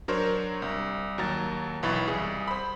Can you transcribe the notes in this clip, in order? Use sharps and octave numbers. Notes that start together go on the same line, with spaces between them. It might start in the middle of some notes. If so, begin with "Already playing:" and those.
F#3 D4 A#4 C5 C#5
C2
D#2 F#3 A#5 A6
B1 E3 B5 C#6 A6
C2 G#4
C5 B5